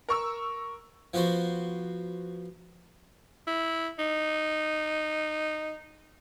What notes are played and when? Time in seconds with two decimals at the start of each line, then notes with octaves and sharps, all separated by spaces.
0.09 A#4 C#6 E6
1.14 F3 B3 F#4 C5
3.47 E4
3.99 D#4